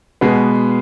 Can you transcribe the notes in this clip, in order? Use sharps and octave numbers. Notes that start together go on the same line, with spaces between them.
B2 G#3 B3